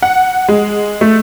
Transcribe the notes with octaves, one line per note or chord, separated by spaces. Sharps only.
F#5
G#3
A3